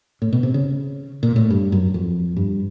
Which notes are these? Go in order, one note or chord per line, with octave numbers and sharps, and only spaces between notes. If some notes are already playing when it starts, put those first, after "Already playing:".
A2
B2
C3
C#3
A#2
A2
G2
F#2
F2
G2